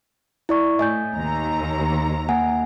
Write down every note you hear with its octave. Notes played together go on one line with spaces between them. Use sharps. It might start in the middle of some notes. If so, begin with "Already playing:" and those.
E4 D5 C#6
A2 D#5 G#5 G6
D#2 A#5
A#3 F#5 G#5